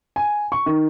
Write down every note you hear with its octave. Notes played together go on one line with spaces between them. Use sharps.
G#5
C#6
D#3